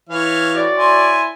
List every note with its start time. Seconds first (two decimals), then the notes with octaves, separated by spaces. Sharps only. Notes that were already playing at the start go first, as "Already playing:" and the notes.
0.09 E3 C#5 F5
0.54 A2 F#4 D5
0.76 E4 G#5 C6